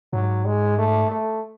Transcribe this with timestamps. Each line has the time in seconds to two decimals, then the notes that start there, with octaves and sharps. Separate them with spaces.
0.13 G#2 F#3
0.45 G#3
0.79 A3
1.11 A3